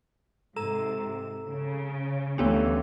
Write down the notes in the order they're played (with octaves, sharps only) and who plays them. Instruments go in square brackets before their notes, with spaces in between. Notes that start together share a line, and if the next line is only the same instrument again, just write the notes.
[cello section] G#2 C3 [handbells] A4 [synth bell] A#5 E7
[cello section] C#3
[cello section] D2 E3 [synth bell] B3 C#4 D4 [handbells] G4 A4 C#5